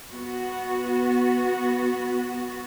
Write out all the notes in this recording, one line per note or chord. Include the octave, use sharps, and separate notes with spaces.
B3 F#4